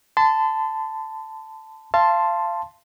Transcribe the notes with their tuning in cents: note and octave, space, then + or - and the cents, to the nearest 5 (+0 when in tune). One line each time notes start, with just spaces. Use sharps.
A5 +0 C6 -40
F5 -30 A5 +0 C6 +0